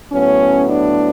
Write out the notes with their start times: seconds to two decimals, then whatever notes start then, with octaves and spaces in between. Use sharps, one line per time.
0.11 A2 F#3 B3 C#4
0.68 D4